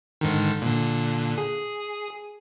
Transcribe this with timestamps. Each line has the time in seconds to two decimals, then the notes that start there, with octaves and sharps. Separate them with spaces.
0.21 G#2 D3 D#3
0.62 A#2 D3
1.38 G#4